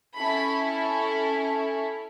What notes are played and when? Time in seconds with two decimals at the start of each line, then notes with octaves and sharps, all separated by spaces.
0.17 C#4 E4 A4 B5